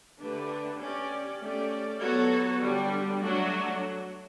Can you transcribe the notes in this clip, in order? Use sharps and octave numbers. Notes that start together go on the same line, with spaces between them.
D3 A3 D4 G4 B4
C#4 G4 D5
A3 C#4 G4 D5
F#3 B3 F#4 A4 C#5
D3 G3 D4
F#3 A3 D4 F#4